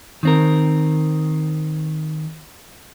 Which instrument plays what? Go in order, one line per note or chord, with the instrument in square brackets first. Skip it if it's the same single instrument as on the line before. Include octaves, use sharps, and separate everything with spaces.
[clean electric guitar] D#3 C4 A#4